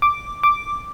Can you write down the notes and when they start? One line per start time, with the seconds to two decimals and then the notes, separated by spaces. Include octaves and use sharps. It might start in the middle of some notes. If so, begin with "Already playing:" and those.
0.02 D6
0.43 D6